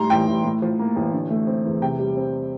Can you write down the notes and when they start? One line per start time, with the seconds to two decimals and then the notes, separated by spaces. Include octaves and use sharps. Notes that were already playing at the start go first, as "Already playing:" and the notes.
Already playing: A2 G3 A#5 C6
0.10 A1 G5
0.27 A1
0.44 A2
0.62 F3
0.79 A#3
0.96 A1
1.13 D3
1.30 A3
1.47 C4
1.65 E2
1.81 C3 G5
1.99 G3
2.17 C4